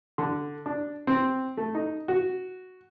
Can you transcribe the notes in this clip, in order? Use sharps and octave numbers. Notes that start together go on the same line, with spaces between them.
D3
D4
C4
A3
D#4
F#4